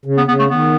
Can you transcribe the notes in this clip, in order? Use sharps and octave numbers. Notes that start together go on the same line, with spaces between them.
C#3
B3
C#3 B3
A3
D#3 B3